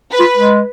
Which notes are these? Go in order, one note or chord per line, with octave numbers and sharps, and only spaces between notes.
B4
F4
G#3